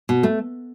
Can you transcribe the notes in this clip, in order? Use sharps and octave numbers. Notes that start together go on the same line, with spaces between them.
B2
A3